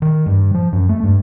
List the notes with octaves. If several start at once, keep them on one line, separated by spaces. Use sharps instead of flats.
D#3
G2
F3
F#2
A3
G2